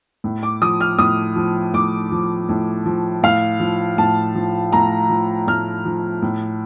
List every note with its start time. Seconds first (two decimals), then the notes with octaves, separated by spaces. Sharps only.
0.24 A2
0.43 D6
0.62 F3 D#6
0.81 F6
0.98 A2 D#6
1.36 F3
1.74 A2 D6
2.11 F3
2.49 A2
2.86 F3
3.23 A2 F5
3.60 F3
3.98 A2 A5
4.35 F3
4.73 A2 A#5
5.09 F3
5.47 A2 F6
5.85 F3
6.22 A2